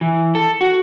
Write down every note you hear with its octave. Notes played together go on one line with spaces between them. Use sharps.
E3
A4
F#4